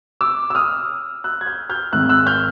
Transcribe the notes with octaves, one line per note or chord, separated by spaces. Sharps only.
D6 E6
E6
D#6 F6
E6 F#6
G#6
F6 G6
F6 G6
G#1 G#2 D#3 G#3 E6 F#6
E6 F#6
F6 G6